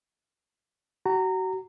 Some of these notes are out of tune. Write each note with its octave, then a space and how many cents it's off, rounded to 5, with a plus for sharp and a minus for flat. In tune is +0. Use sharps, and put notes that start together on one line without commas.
F#4 +30 A#5 -20